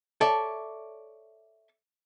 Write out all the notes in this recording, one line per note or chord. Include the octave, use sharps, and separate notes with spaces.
A4 C#5 D5 E5